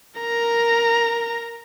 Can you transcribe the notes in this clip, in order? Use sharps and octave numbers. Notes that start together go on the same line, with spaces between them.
A#4 A#5